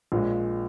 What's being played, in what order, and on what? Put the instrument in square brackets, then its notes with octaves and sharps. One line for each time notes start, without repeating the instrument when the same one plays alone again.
[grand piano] A#1 A#2 G#3